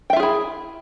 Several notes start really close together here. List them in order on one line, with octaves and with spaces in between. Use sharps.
G5 E5 F4 G#4 E4